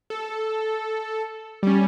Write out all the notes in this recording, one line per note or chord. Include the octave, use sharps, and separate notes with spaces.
A4
G3 C#4